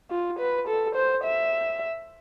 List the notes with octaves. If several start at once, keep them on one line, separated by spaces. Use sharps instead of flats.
F4
B4
A4
C5
E5